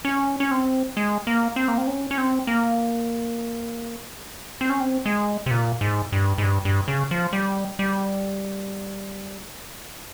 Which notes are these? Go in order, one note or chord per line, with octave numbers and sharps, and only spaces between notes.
C#4
C#4
C4
G#3
A#3
C4
A#3
C4
C#4
C#4
C4
A#3
C4
C#4
C4
G#3
C3
A#2
G#2
G2
G#2
G2
G2
C#3
F3
G3
G3